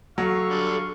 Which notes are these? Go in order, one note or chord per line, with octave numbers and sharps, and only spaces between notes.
F#3 A4 F5 C#6
D3 G3